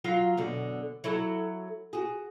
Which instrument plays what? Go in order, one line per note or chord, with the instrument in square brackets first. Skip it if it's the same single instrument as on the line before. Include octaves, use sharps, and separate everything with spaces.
[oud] F#3 F4 F5
F#2 B2 D3
F#3 E4 A4
F#4 G#4